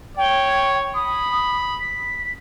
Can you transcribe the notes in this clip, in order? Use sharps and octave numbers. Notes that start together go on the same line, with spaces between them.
C#5 G5
B5 D#6
B6